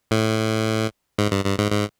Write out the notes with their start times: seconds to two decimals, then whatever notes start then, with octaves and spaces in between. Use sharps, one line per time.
0.11 A2
1.19 G#2
1.32 G2
1.45 G2
1.58 G#2
1.72 G#2